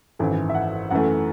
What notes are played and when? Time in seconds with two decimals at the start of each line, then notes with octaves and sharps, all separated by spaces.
0.19 G#1 F#2 E3 A4
0.49 E5
0.55 F#5
0.90 F#2 E3 A3 F#5